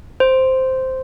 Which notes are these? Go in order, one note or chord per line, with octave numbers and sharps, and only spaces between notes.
C5